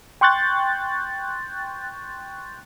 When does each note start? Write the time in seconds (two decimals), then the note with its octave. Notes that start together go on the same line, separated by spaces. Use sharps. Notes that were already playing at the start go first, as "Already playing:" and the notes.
0.21 G5 C6 C#6 F#6 G6 A6